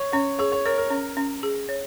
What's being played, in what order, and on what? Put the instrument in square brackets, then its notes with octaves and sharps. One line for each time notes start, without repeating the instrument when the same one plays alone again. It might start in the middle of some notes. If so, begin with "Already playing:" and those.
Already playing: [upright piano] C#5
[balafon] C#4 [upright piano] C#5
[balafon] G#4 [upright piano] C#5
[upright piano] C#5
[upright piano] A#4 [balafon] C#5
[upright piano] A#4
[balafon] C#4
C#4
G#4
C#5